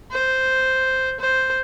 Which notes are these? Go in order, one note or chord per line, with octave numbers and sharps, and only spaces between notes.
C5
C5